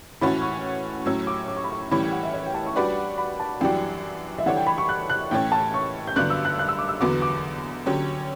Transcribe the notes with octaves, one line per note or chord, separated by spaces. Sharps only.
A2 E3 A3 C#4 F#4 B5
C#6
A2 F#3 C#4 E6
D6
D6
C#6
B5
C#6
A2 E3 G3 C#4 B5
G5
F#5
E5
C#5
G5
A5
C#6
G3 D4 F#4 B4 D5 B5
B5
A5
F#2 E3 G3 D4 F#4 G5
E5
E3 G3 D4 A4 C#5 F#5
G5
B5
C#6
F#6
F#6
A2 E3 A3 C#4 G5
A5
C#6
G6
G2 D3 F#3 B3 D4 F#6
E6
F#6
F#6
E6
D6
E6
E2 D3 F#3 B3 F#4 D6
D6
D3 F#3 C#4 G4